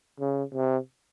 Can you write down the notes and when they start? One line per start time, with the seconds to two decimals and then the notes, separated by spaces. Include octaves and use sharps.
0.20 C#3
0.54 C3